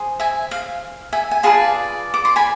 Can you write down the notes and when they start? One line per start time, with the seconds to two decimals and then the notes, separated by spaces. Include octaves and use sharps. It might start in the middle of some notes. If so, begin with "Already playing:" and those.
Already playing: G#4 C5
0.20 E5 G#5
0.51 F5
1.13 E5 G#5
1.31 G#5
1.43 F4 G#4 B4 D5 F5 A5
2.14 D6
2.25 C6
2.36 G#5 B5